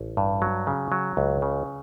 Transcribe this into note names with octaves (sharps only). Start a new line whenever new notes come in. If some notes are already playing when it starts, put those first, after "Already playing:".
Already playing: A1
G2
F#3
C#3
F#3
C#2
C#3